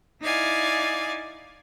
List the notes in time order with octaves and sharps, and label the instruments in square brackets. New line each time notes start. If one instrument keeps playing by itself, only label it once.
[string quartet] D#4 E4 D5 F5 G#5